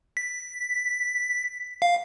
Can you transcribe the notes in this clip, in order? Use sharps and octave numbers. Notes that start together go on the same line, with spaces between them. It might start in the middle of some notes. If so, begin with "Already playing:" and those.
B6
F5